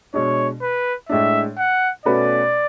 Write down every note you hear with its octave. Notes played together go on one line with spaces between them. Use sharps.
B2 G#3 D4 C#5
B4
A2 G#3 D4 E5
F#5
B2 A3 C#4 F#4 B4 D5